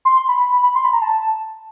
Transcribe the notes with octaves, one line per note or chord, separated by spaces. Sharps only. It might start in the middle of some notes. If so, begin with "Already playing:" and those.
C6
C6
B5
B5
B5
B5
C6
B5
A#5
A5